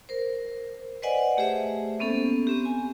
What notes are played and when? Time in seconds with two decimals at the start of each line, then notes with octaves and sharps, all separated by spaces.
0.09 A#4 C5
1.02 B4 C5 D5 D#5 F#5 G#5
1.37 A3 G4 G#4 C5 E5
2.00 A#3 B3 C#4 A4
2.47 B3 C4 G4
2.65 G#5